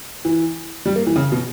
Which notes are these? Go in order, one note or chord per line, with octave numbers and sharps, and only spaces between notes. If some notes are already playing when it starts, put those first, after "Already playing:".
E3
G3
A#3
E3
C#3
B2